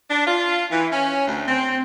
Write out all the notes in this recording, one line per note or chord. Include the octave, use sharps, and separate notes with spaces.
D4
F4
E3
C#4
D2
C4